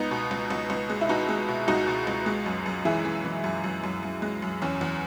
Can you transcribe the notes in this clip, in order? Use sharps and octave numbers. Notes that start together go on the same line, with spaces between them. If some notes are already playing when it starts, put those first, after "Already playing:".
Already playing: C#2 B3 D#4
B2
C#2
C#2
C#2
G#3
E4
B2 D#4 F#4
G#3
B2
C#2 D#4 F#4
B2
C#2
G#3
F#2
F#2
E3 E4 G#4
E3
E3
F#2
F#2
F#2
F#2
G#3
F#2
E2 C#4
E2